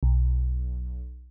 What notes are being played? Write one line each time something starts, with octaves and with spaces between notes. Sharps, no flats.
B1